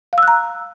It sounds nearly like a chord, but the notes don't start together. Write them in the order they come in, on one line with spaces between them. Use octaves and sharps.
F5 E6 F#6 A#5